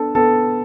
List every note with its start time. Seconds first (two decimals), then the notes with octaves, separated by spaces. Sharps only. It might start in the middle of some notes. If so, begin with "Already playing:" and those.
Already playing: B3 D4 A4
0.15 B3 A4